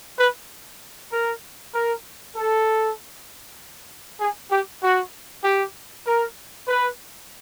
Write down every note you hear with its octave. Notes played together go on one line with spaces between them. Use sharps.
B4
A#4
A#4
A4
G#4
G4
F#4
G4
A#4
B4